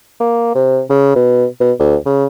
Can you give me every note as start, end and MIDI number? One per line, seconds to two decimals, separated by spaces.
0.20 0.54 58
0.55 0.80 48
0.89 1.10 49
1.16 1.45 47
1.60 1.72 47
1.79 1.95 38
2.05 2.26 49